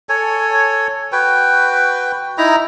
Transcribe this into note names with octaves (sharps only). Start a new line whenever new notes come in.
A4 C#5 G#5
F#4 B4 G5
D#4 E4 A#5